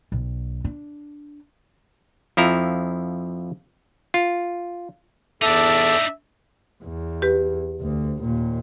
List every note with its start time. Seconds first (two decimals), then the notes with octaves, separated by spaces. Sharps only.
0.12 B1
0.64 D4
2.37 F2 F3 E4 A#5
4.14 F4
5.42 E2 D4 D#4 A4 E5 D6
6.84 E2
7.22 G4 B4
7.81 D2
8.22 D#2 A#2